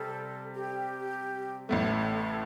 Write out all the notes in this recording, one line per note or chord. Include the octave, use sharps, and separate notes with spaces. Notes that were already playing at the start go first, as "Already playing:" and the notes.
Already playing: C3 G3 C4 A4
G4
A1 A2 A3 A4